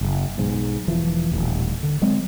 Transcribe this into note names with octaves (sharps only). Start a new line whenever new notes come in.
F#1
B1 G#2
E1 E3 F3
D#1 A1
D3
F#3 G#3 C4